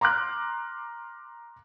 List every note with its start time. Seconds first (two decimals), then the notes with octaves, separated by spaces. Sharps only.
0.01 A#5 C6 D6 F6 F#6